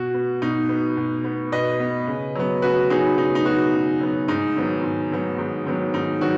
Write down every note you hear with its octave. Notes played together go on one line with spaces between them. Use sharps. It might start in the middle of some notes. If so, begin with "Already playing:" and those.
Already playing: B2 F#4
B3
B2 D#4
B3
B2
B3
B2 B4 D#5
B3
C#3
F#3 B3
C#3 F#4 B4
F#3 B3 D#4 G#4
C#3 D#4
D#4
F#3 B3 F#4
C#3
F#3 B3
G#2 D#4
D#3 F#3 B3
G#2
D#3 F#3 B3
G#2
D#3 F#3 B3
G#2 D#4
D#3 F#3 B3 F#4